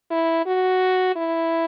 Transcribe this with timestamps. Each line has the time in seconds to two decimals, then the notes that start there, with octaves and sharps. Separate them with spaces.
0.11 E4
0.46 F#4
1.16 E4